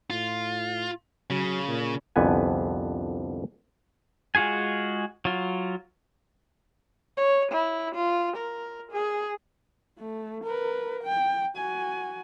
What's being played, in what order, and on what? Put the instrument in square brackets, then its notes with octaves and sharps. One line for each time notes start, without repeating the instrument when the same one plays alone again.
[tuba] A2 [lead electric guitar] F4
[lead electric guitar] C#3 [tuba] F#3
[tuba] A#2
[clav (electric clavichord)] C2 F2 D3 B3 B4 G#5
[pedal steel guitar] G#3 F4 F#4 G#4 G#5
F#3 F4
[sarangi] C#5
E4
F4
A#4
G#4
[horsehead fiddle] A3
A#4 B4
G5
F#4 G#5